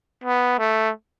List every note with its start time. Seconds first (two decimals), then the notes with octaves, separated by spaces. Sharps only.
0.24 B3
0.59 A3